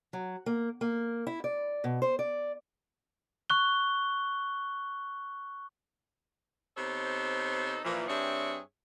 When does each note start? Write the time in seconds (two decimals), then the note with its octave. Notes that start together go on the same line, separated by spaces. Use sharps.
0.13 F#3
0.46 A#3
0.81 A#3
1.27 E4
1.44 D5
1.84 B2
2.02 C5
2.19 D5
3.50 C#6 F#6 G7
6.77 C3 B3 D#4 A4 C5 C#5
7.84 A#2 E3 F3
8.08 G2 C4 D4 G#4 C#5 E5